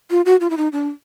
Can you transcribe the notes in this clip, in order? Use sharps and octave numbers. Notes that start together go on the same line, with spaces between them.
F4
F#4
F4
E4
D#4
D4